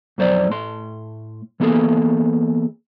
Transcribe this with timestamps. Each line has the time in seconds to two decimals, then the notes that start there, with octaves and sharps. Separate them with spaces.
0.18 F2 F#3 C5 D5
0.49 A2 A3 C6
1.60 E3 A#3 B3 G#4 A4